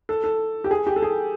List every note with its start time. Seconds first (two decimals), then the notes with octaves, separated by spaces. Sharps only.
0.09 A4
0.24 A4
0.64 G4
0.71 G#4
0.87 G4
0.96 A4
1.02 G#4